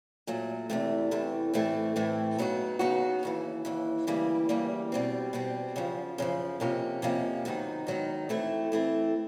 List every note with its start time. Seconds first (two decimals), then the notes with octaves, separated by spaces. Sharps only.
0.27 A#2 F#3 A3
0.70 E2 C3 E3 A3
1.11 E2 C3 E3 A3
1.53 A2 E3 A3 C4
1.96 A2 E3 A3 C4
2.38 C#3 F#3 B3 D#4 F#4
2.79 C#3 F#3 B3 D#4 F#4
3.23 D#2 C#3 E3
3.65 D#2 C#3 E3
4.07 D2 C#3 E3 G3 A#3
4.49 D2 C#3 E3 G3 A#3
4.92 B2 G3 C4
5.33 B2 G3 C4
5.76 F#2 C#3 F3
6.18 F#2 C#3 F3
6.60 F2 C3 F3 A#3 C#4
7.02 F2 C3 F3 A#3 C#4
7.45 G#2 D#3 F#3 B3 D#4
7.87 G#2 D#3 F#3 B3 D#4
8.29 E3 A3 C4 E4
8.72 E3 A3 C4 E4